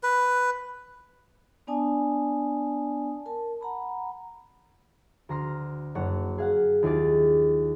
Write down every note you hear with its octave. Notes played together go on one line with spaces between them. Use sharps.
B4
B3 D4 D5 G#5 A5 D#6
A#4 A5
F#5 A#5 B5
D2 A#5 C6 F6
F#1 C#5 F#5
G#4 F5 F#5
D#2 E4 F4 G#4 D6 A6